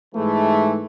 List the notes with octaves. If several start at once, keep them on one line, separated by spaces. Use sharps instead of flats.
G#2 E3 G#3 A3